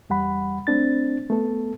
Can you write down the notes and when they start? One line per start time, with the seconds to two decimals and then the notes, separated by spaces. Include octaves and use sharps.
0.10 E2 G3 F#5 B5
0.67 A3 C4 D4 A6
1.30 A3 B3 A4